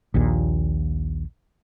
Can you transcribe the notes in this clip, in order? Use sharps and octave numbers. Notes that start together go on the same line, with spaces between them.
A#1 D#2 A#2